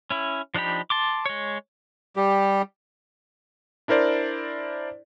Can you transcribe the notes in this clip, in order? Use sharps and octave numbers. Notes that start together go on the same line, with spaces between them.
C#4 E4
F3 D4 D#4 G4 B5
A5 C6 D6
G#3 C#5
G3 G4
D4 E4 A#4 C5 D5